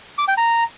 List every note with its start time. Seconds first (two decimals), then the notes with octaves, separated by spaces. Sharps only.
0.18 D6
0.28 G5
0.38 A#5